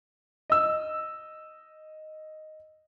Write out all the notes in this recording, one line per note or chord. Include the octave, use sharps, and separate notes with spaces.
D#5 E6